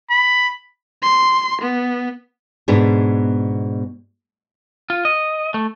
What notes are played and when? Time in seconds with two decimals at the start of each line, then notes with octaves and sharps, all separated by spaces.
0.10 B5
1.03 C6
1.61 B3
2.68 G#2 B2 B3 D4 G#4
4.90 F4
5.05 D#5
5.54 A3